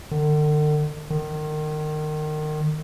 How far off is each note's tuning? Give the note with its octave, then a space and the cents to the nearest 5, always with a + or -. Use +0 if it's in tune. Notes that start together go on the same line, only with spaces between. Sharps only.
D3 +45
D#3 -30